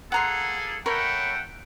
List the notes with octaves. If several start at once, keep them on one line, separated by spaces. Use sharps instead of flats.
A#3 G#4 A4 F#5 A#5 C6
A3 A#4 C#5 F#5 G5 B5